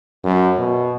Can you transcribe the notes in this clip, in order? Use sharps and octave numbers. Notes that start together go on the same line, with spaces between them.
F#2
B2